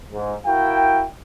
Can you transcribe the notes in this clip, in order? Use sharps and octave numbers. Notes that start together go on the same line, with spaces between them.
G#2
E4 F#4 A#4 F5 G5